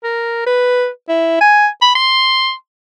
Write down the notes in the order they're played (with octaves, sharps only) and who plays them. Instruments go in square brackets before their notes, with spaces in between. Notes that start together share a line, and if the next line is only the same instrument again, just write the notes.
[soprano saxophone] A#4
B4
E4
G#5
B5
C6